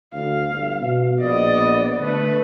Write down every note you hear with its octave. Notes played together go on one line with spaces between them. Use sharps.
D2 F5
G1
B2
A#1 B3 D5 D#5
D3 A3 B4